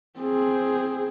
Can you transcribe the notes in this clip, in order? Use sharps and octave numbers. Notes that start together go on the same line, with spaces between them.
C4 G#4